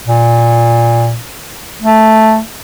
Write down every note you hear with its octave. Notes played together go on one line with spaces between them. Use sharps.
A#2
A3